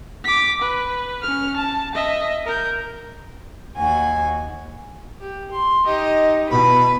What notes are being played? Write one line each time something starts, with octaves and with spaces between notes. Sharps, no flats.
D6 B6
B4
C#4 F6
A5
D#5 E5
A#4 G6
D#2 F#4 G#5
G4
C6
D#4 G4 D#5
B2 E4 B4 B5